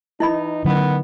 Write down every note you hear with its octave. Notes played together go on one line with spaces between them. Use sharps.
E3 D#4 E4 D#5 B5
D3 D#3 F#3 B3 C#4